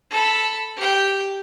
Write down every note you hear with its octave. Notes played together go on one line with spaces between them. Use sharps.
A4 B5
G4 G5